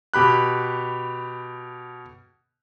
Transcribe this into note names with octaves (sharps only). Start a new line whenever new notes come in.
B2 G4 B5 F#6